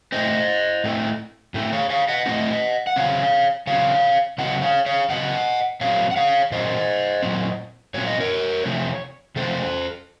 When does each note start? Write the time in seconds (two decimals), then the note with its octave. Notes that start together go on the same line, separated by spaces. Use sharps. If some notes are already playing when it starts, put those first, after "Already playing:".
0.12 A2 A3 C4 C5 D#5
0.84 A2 A3 C4
1.54 A2 A3 C4
1.73 C#5 F5
1.90 C#5 F5
2.08 D#5 F#5
2.26 A2 A3 C4 D#5 F#5
2.87 F#5
2.96 C#3 F#3 C4 C#5 F5
3.67 C#3 F#3 C4 C#5 F5
4.38 C#3 F#3 C4 D#5 F#5
4.62 C#5 F5
4.86 C#5 F5
5.10 C#3 F#3 C4 D#5 F#5
5.81 A#2 F#3 C4 C#5 F5
6.11 F#5
6.16 C#5 F5
6.52 A#2 F#3 C4 C5 D#5
7.22 A#2 F#3 C4
7.94 A#2 F#3 C4 C#5
8.07 D#5
8.20 A#4 C#5
8.65 C3 F3 A3 C4
9.36 C3 F3 A3 C4 A4 C5